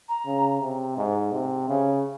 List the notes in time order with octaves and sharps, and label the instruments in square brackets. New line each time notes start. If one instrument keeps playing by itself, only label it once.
[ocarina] A#5
[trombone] C#3
C3
G#2
C3
C#3